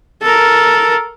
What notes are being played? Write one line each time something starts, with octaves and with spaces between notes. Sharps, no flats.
A4 A#4